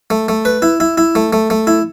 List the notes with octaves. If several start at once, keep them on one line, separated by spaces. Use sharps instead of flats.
A3
A3
B4
E4
E4
E4
A3
A3
A3
E4